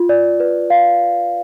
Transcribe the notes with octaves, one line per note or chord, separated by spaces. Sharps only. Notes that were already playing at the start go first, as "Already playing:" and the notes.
Already playing: F4
D5
B4
F5